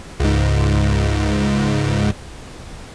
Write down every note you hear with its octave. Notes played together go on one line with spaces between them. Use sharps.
C#2 G#2